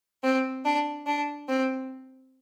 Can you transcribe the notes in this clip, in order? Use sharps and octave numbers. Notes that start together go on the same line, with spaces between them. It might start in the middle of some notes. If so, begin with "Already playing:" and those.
C4
D4
D4
C4